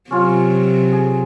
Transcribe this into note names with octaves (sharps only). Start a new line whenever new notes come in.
C3 F#3 C#4 F4
G#4